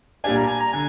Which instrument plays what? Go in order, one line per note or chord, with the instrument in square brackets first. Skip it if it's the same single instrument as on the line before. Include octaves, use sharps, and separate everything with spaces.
[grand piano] A#2 G3 D4 [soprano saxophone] G#5
[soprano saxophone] A#5
G#5
A#5
[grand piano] D3 [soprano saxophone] G#5